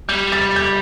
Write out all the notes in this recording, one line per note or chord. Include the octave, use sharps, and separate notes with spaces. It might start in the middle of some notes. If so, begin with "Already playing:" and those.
G3 G6
A6
G6